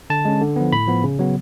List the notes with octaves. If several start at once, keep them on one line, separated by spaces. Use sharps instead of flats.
D3 A5
G#3 C#4
D3
F3 B3
A2 B5
F3 B3
C#3
F#3 B3